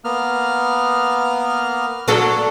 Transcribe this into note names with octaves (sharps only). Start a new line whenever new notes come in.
A#3 B3 F6
F#3 D4 A4